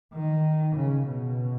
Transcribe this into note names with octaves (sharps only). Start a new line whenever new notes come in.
D#3
C#3
B2